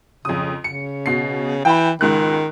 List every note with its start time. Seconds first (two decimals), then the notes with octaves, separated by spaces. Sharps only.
0.25 F2 C#3 D#6
0.64 C#3 C#7
1.06 B2 C7
1.65 E3 G5 B5
2.01 C#2 G#2 D#3 F#6